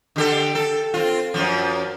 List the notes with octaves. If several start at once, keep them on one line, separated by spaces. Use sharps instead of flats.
D3 G4 A4
A4
C4 F4
F#2 B2 F3